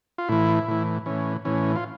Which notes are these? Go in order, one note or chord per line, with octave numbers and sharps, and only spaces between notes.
F4
A2 E3 E4
A2 E3
A2 E3 C#4
A2 E3 C#4
F4